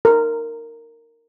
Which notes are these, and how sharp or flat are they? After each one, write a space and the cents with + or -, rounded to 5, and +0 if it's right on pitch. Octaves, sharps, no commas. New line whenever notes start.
A#4 -15